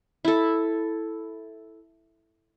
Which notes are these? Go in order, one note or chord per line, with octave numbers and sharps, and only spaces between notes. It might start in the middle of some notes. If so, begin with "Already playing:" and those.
E4 A4